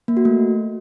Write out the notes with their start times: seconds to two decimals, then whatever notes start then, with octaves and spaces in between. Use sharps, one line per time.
0.08 A#3
0.17 F#4
0.25 A3